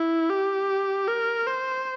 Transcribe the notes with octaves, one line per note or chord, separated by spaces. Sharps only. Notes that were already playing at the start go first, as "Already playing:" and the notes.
Already playing: E4
G4
A#4
C5